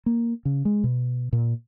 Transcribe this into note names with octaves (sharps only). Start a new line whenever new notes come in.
A#3
C#3
G#3
B2
A#2